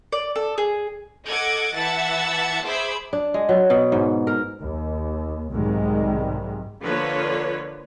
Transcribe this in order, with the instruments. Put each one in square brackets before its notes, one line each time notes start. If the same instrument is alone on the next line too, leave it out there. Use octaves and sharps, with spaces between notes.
[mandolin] D5
A4
G#4
[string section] A4 D#5 F#5 D6 G#6
E3 E5 F#5 A5 A6
G#4 C5 E5 B5 D6
[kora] D4
G#3
F#3
B2
G#2
A#4
[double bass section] D#2
B1 G#2 C3 D#3 G3 G#3
[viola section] D3 F3 A#3 F4 B4 C#5